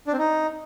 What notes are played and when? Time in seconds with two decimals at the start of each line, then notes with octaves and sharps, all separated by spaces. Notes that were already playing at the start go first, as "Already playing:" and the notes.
0.07 D4
0.13 C4
0.19 D#4